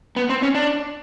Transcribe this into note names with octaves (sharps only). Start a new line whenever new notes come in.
B3
C4
C#4
D4